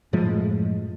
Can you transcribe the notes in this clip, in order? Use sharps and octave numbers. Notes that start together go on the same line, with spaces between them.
F#2 A2 F3 G#3